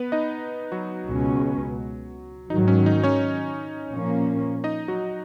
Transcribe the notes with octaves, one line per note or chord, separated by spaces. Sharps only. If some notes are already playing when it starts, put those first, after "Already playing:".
Already playing: B3 B4
D#4 D#5
F#3 F#4
C#2 B2 G#3 C#4
G#2 D#3 F#3 D#4
C#4
D#4
C#4 C#5
A#2 F3 A#3 C#4
D#4 D#5
F#3 F#4